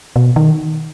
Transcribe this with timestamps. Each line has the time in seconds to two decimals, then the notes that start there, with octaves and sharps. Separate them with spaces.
0.16 B2
0.36 D#3